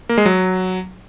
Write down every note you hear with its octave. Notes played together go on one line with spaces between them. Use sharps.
A#3
G#3
F#3